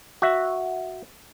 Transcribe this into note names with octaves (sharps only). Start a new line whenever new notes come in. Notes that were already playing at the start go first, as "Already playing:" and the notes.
F#4 E5